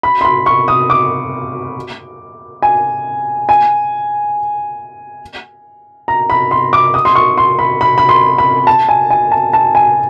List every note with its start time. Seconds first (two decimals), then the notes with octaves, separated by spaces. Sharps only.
0.03 B5
0.21 C6
0.25 B5
0.46 C#6
0.68 D#6
0.90 D6
2.62 G#5
3.49 G#5
6.08 A#5
6.30 B5
6.51 C6
6.73 D6
6.94 D#6
7.05 C6
7.15 C#6
7.38 C6
7.59 B5
7.81 B5
7.98 B5
8.09 C6
8.38 B5
8.67 A5
8.89 G#5
9.10 G#5
9.32 A5
9.53 A5
9.75 G#5